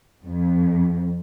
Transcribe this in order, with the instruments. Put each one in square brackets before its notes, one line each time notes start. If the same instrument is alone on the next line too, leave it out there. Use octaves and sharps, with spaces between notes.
[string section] F2